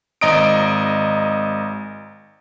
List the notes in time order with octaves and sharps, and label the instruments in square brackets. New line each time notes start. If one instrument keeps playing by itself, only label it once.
[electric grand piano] G#1 D#5 A#5 D#6 D7